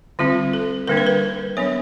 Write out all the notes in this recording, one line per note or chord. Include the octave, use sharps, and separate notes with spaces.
D3 G3 C4 F4
A4
D3 G3 A#3 D4 A#4
B4
A#4
F#3 B3 D4 C#5